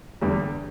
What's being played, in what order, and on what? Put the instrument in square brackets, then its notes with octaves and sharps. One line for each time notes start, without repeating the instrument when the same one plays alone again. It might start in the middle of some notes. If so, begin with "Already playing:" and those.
[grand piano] E2 D3 G3